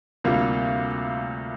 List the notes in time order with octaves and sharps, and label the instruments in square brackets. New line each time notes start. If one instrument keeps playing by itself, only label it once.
[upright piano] D2 C3 G3 A#3 F4